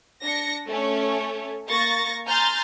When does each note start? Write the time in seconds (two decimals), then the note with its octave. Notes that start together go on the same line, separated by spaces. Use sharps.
0.24 D4 A#6 C#7
0.69 A3 C#4 C#5
1.70 A#3 C#6 A6 A#6
2.27 G#5 A#5 C6 F6 G6 A6